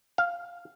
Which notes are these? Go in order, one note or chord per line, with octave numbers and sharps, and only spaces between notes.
F5